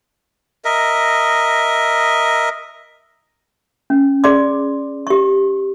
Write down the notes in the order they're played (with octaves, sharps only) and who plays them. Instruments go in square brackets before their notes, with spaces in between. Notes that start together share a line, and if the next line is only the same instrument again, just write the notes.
[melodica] A#4 D#5 E5
[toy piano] C#4
G#4 D5 C6 D6
G4 C#6